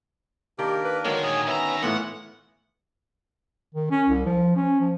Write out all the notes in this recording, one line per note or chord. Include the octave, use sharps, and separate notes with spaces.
D#3 A#3 D4 G4 A#4
B4
D3 D#3 F#3 G#3 C#5
A#2 G#4 G#5
C#2 B3 C#4 E5 A#5
A2 E3 B3 F4 F#5
D#3
C#4
C2
F3
C#4
F3